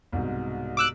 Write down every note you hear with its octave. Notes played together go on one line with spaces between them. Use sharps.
C2 G#2 B2
D6 E6 F#6